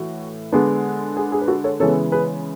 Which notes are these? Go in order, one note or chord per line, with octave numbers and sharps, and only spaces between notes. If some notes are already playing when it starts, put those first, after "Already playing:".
Already playing: A2 E3 F#4
D3 G#3 B3 D4
G#4
G#4
B4
F#4 A4
A4 C#5
C#3 E3 G#3 B3 A4 C#5
G#4 B4